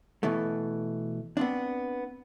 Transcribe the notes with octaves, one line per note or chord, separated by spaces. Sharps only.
B2 E3 A3
B3 C4 D4